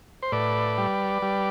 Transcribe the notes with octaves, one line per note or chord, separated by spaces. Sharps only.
C5
A2 B4 D5
G3
G3